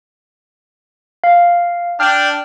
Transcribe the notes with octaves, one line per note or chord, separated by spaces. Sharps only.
F5
D4 G5 F6